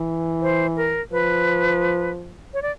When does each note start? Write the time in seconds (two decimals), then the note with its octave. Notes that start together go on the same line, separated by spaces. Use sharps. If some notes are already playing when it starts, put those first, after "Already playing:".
Already playing: E3
0.42 C5
0.77 A#4
1.12 F3 B4
2.54 C#5
2.62 D5